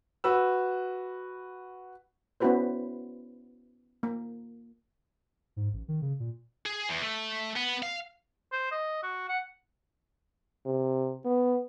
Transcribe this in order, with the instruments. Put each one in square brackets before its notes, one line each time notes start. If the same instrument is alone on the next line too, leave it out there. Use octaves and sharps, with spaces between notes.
[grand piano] F#4 B4 E6
[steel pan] B3 C#4 E4 F#4 B4 C5
A#3
[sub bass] G#2
A1
D#3
C#3
A#2
[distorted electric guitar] G#4
E2
A3
B3
F5
[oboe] C5
D#5
F#4
F#5
[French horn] C3
B3